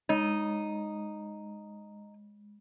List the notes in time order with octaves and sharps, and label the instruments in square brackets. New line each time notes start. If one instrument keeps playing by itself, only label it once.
[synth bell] G#3 [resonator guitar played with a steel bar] D#4